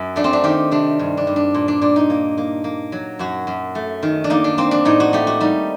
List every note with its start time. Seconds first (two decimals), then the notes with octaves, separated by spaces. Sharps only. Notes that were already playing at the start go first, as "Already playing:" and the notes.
Already playing: F#2
0.16 A3 D4
0.24 C4
0.33 D4
0.44 D#3 G4
0.72 C3 D4
0.99 G2
1.17 D4
1.27 G2
1.36 D4
1.55 A#2
1.68 D4
1.81 A#2 D4
1.96 D#4
2.10 A#3
2.38 A#3
2.64 A#3
2.92 F#3
3.19 F#2 F#4
3.47 F#2
3.75 A3
4.03 D#3
4.24 D4
4.30 A#3 D#4
4.44 D4
4.58 A#3 C4
4.71 D4
4.85 A2 D#4
5.00 F#4
5.13 A3 G4
5.27 F#4
5.41 G3 D#4